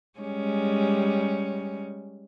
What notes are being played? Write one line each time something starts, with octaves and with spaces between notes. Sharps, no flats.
G3 G#3 C#4